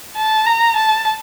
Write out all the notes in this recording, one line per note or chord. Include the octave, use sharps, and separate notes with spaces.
A5
A#5
A5